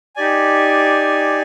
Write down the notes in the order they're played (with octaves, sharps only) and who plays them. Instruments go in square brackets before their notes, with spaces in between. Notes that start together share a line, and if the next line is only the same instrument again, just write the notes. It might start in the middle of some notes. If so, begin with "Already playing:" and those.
[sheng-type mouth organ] D#4 G4 D5 G#5